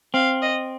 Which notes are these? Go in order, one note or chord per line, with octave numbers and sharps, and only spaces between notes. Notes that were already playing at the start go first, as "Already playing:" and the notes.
C4 F5
D#5